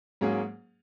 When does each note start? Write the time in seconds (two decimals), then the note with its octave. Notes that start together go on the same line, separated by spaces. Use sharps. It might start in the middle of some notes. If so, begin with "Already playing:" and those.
0.21 G#2 F#3 A#3 C#4 G#4